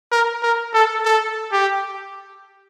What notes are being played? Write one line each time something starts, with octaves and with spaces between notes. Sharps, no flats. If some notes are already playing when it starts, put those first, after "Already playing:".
A#4
A#4
A4
A4
G4